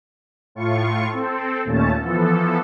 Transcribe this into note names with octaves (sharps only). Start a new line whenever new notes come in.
A2 F4 C#6
C4 A4
D#2 A#2 A3 C#4 A5
E3 F3 B3 A4